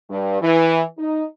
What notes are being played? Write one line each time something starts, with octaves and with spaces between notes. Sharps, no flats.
G2
E3
D#4